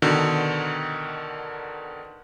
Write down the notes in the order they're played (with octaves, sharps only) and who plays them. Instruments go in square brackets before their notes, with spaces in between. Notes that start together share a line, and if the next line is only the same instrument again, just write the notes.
[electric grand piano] B2 D3 D#3